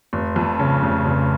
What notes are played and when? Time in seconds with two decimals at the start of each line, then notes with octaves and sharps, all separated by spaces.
0.13 F1
0.36 F2
0.59 C#3
0.83 F1
1.06 F1